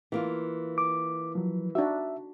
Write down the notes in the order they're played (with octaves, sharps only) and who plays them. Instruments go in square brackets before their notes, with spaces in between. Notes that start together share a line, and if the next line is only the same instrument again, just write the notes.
[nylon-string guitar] E3 A#3 F4
[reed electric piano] D6
F3 F#3
[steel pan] D4 D#4 F#4 [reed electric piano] E5